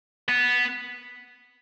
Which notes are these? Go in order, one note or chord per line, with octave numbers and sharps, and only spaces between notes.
B3